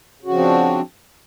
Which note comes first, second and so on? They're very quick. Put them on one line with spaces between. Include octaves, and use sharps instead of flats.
C#3 F#4 F3 C4 D4